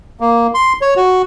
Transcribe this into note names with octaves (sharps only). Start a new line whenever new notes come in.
A#3
C6
C#5
F#4